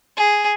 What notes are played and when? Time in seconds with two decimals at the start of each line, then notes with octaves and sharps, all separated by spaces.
0.17 G#4